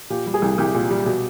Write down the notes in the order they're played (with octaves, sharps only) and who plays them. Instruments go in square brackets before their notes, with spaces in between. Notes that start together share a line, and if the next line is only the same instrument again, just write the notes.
[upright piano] A#2 [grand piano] G4
[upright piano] G3
[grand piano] G#4
[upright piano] C2
[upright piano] C2 [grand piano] G4
[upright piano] A#2
G3
B2